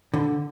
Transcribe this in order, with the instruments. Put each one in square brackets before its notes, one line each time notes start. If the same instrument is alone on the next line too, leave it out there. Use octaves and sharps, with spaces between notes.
[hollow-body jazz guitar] D3